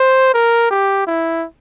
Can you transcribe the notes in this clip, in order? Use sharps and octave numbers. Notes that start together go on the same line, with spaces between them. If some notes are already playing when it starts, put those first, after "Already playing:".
Already playing: C5
A#4
G4
E4